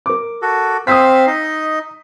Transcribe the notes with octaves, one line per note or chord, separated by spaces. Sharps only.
A#4 D6
F#4 A4
C4 C5 F5 D#6 E6 B6
D#4 D#5